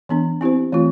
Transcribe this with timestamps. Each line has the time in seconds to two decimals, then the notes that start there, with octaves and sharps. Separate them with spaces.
0.09 E3 B3 D4
0.41 C4 E4 G4 C5
0.72 E3 A3 C4 F4